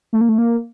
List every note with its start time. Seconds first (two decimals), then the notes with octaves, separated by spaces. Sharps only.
0.13 A3
0.21 A#3
0.29 A3
0.38 A#3